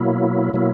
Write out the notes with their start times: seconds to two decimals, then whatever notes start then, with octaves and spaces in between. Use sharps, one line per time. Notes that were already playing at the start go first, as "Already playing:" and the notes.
Already playing: B2 F#3 A#3 E4
0.53 B2 F#3 A#3 E4